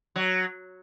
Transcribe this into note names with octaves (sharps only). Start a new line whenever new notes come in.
F#3